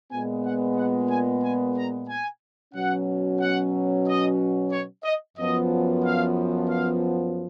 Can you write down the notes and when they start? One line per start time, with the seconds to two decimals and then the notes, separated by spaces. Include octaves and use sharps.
0.11 A#2 G#3 B3 G#5
0.45 F#5
0.76 F#5
1.09 G#5
1.43 G#5
1.76 A#5
2.08 G#5
2.74 B2 F#3 C#4 F#5
3.39 F#5
4.06 D#5
4.71 C#5
5.04 D#5
5.37 F#2 F3 B3 D#5
6.03 F5
6.69 F5